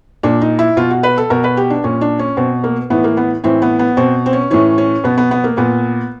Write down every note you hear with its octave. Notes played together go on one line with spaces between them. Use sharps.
A#2 D4
D#4
E4
B2 F4
F#4
B4
A4
B2 A#4
B4
G4
D4
A#2 C#4
D4
C#4
B2 C4
A#3
A2 E3 B3
A#3
B3
A2 E3 C4
B3
B3
B2 C4
C4
C#4
A2 E3 C#4
C#4
B2 B3
B3
B3
A#3
A#2 B3